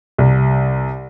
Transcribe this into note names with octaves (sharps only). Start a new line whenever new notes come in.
C2